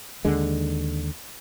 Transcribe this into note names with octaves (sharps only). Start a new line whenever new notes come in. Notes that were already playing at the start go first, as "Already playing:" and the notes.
D#2 D3 G#3